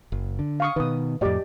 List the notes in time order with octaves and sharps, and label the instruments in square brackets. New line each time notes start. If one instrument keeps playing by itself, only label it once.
[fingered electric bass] F#1
D3
[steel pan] F5 C#6 D#6
[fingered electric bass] B2 D#3 [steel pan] B4 D#6
[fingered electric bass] F2 A2 [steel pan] G4 D5 D#5